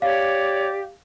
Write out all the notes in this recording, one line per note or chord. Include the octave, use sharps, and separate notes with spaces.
G4 C#5 D5 F5